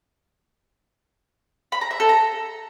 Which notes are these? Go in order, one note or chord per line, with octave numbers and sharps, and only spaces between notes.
B5
A#5
E5
A4
A#5